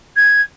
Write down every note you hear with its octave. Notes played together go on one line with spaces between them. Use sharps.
G#6